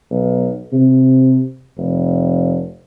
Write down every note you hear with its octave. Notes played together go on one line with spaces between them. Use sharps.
B1
C3
F1